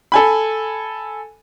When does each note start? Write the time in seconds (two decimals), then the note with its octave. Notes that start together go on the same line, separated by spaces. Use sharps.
0.12 A4 G#5 B5